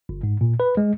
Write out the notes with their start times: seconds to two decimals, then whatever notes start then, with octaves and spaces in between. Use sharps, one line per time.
0.09 G1
0.23 G#2
0.41 A#2
0.60 B4
0.77 G#3